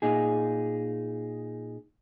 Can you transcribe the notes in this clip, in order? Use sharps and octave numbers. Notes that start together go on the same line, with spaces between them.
A#2 D#4 G#4